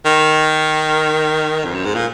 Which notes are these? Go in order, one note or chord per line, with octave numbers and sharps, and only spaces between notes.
D#3
F2
F#2
G#2
A#2